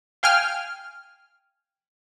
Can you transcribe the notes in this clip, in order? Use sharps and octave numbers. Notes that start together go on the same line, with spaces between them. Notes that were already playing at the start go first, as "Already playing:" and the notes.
F5 G5 G#5 F6